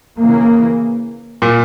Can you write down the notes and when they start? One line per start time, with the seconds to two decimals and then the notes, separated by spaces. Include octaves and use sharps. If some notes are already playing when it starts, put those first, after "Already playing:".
0.18 C#3 E3 A#3
1.42 A#2